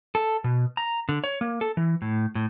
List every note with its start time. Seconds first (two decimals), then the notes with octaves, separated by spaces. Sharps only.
0.15 A4
0.44 B2
0.77 A#5
1.09 D3
1.24 C#5
1.41 A#3
1.61 A4
1.77 E3
2.02 A2
2.35 A2